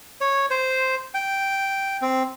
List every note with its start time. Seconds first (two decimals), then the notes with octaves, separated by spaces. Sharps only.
0.21 C#5
0.50 C5
1.14 G5
2.02 C4